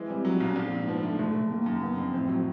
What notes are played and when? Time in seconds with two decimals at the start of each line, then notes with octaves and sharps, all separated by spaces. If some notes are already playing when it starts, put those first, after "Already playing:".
Already playing: E3 G#3 C4
0.09 G3
0.25 F#3
0.40 B1
0.50 C#4
0.56 A#1 C4
0.72 G#2
0.87 F3 B3
1.03 D3 A3
1.19 F#1 A3
1.35 F#1
1.51 D#3 A#3
1.66 F#2
1.82 C#3 B3
1.98 F2 C4
2.14 A2 C4
2.29 F#3